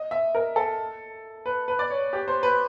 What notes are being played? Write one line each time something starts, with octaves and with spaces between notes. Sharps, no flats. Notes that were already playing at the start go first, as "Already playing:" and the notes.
Already playing: D#5
E5
A#4
A4
B4
B4
D5
C#5
G4
C5
B4